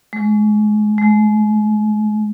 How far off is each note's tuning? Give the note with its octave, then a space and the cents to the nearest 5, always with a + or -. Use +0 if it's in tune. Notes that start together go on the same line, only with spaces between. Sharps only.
G#3 +30
G#3 +40